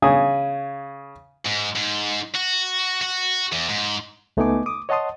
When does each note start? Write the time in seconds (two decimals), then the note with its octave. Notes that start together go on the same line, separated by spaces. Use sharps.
0.02 C#3 G#5 D#6
1.46 G#2
1.76 G#2
2.35 F#4
3.01 F#4
3.52 E2
3.69 G#2
4.37 C#2 A3 B3 D#4 G#5 D6
4.66 D6 D#6
4.89 C#5 D#5 F#5 A5 C6 D#6